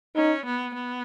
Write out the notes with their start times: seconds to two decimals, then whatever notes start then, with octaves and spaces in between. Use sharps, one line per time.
0.16 C#4 D#4
0.45 B3
0.74 B3